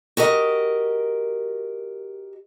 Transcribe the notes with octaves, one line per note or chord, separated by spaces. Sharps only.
F#4 G4 A#4 D#5